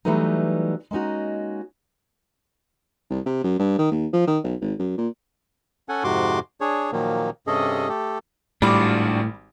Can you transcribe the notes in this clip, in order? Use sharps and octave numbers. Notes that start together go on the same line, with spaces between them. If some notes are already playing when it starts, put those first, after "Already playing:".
E3 F#3 G3 A3 B3 D#4
G#3 A#3 C#4 D#4 F#4
C2
C3
F#2
G2
D#3
D#2
F3
D#3
B1
G#1
F#2
A#2
C#4 A4 F#5 G#5
F2 G#2 C3 F#4 C6 D6
D4 G#4 C#5
A#2 D#3 F3 F#3 A#3
G2 C3 C#4 G#4 A4 D#5
A3 G4 A4
G#1 A2 G3 D4 F4 F#4 B5 D6